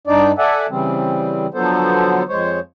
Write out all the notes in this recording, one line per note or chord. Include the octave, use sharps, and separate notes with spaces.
G2 D4 D#4 D5
A4 D5 E5 F#5 G#5
C#3 E3 G3 C4
D3 F3 F#3 B3 A4 C5
F2 G#3 C5 C#5